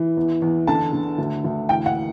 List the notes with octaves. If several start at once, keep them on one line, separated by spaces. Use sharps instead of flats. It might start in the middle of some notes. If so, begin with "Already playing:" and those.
Already playing: E3
E2
E2
D3 A5
D3
D2
D2
E3 G5
F#5